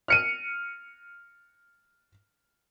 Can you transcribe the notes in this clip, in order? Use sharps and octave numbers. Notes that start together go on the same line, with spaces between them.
F6 C#7 D#7